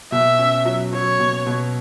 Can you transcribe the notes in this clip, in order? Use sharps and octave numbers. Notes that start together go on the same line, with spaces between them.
B2 E5
C#4
F#3
F#3 C#5
B2
B2